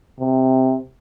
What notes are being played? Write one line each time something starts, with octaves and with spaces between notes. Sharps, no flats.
C3